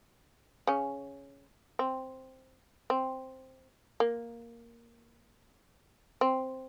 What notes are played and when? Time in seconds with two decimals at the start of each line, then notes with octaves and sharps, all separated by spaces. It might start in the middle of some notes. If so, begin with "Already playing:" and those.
0.67 C#3 C#4
1.79 C4
2.90 C4
4.00 A#3
6.21 C4